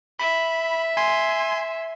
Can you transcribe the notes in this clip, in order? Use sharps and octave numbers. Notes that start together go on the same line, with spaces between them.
E5 B5
G#5 C6